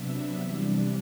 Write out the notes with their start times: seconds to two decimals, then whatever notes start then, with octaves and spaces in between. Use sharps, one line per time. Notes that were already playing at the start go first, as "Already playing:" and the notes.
Already playing: C3 F#3 B3 D4 E5
0.38 C3 E3 G3 D4